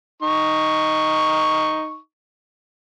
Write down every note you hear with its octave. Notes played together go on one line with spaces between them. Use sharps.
D#4 C#6